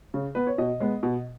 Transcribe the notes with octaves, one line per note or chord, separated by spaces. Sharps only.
C#3
B3 B4
C#5
B2 D#5
G#3 B3
B2